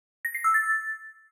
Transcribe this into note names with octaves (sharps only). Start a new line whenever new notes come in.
A#6
C7
E6
A6